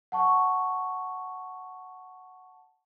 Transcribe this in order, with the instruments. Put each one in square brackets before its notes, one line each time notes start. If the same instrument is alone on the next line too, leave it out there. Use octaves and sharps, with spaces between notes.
[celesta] F#5 A5 C#6